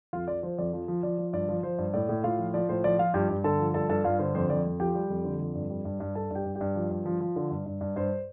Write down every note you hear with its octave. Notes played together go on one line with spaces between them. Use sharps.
F2 F4 F5
F3 D5
F3 C5
F2 D5
F3
F3
F3 D5
F3
G2 D5
F3
F3 C5
G2
A2 D5
A2
A2 F4 F5
F3
F3 D5
A2 C5
F3 D5
F3 F4 F5
G2 G4 G5
G2
D3 A4 A5
F3
G2 A4 A5
G2 A4 A5
G2 F4 F5
D3 C5
F2 C5
F2 D5
F2
F3 G4 G5
G3
F2
D3
F2
G2
G3
G2
G2
G2 A4 A5
G2 G4 G5
G2
G4 G5
G2
F3
G2
F3
F3
D3
G2
G2
G2
G2 C5